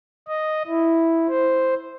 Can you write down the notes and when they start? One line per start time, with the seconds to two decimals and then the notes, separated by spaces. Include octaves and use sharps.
0.28 D#5
0.67 E4
1.28 C5